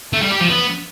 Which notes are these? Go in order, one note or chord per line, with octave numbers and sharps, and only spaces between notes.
A3
G3
G4
F3
B3